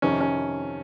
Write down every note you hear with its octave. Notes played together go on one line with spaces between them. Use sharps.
F2 C3 D#3 C#4
C#4